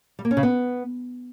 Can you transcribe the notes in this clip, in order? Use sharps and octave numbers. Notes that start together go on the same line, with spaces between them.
G3
A#3
C#4
C#3
B3